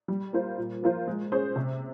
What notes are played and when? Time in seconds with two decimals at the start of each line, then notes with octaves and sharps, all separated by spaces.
0.08 G3
0.33 A#3 F4 C5
0.58 A#2
0.82 F3 A#3 F4 C5
1.07 G#3
1.32 C#4 G#4 C5
1.56 C3